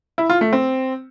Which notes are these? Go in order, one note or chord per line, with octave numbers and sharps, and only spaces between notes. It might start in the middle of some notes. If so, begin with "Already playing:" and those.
E4
F4
A3
C4